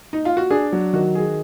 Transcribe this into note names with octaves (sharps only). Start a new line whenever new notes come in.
D#4
F4
F#4
D4 G#4
F#3
D#3 F#4
G#4